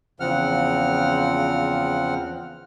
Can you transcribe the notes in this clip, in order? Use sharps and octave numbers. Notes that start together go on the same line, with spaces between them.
E2 C#3 F3 C4 F#5 F6